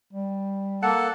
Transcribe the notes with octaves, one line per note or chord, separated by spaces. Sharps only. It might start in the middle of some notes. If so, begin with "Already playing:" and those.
G3
A#3 A4 F#5 A5